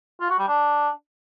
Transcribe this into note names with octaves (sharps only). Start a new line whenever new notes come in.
F4
F#4
G3
D4